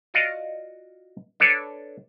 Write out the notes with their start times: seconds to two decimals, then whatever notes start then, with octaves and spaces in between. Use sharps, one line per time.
0.14 F4 F#4 D5 D#5 F5 F#5
1.40 D4 A4 B4 C#5 D5